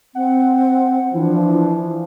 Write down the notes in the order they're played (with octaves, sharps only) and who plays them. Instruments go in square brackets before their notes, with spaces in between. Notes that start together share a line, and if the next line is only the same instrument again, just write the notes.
[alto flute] C4 [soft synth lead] F#5
[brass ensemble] E3 F3 [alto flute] D4 [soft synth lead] E4